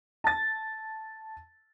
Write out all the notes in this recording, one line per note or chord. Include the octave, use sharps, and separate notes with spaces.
A5 A6